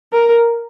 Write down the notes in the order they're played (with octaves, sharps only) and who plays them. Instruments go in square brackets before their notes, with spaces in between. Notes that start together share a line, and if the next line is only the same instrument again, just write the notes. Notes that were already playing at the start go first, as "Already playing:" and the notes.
[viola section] A#4